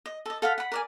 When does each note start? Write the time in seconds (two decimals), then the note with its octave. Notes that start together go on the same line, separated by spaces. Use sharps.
0.06 D#5
0.26 A4 D#5
0.42 A4 F5 F#5 B5
0.58 F#5 B5
0.72 A#4 D5 G#5